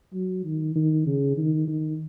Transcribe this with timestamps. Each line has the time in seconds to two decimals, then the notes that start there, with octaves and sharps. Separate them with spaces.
0.13 F#3
0.45 D#3
0.76 D#3
1.07 C#3
1.37 D#3
1.68 D#3